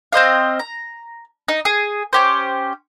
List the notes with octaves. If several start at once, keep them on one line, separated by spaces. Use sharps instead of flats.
C4 C5 D#5 F5
A#5
D#4
G#4
C#4 G4 C5